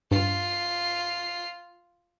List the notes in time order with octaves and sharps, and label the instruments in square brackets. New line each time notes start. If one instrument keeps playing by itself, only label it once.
[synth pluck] G2 [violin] F4 C7